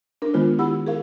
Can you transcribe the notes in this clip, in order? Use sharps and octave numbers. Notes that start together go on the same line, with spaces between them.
D4 A#4
D#3 G#3 B3 F4 C5
E4 G4 F#5 B5 E6
G#4 A#4 F5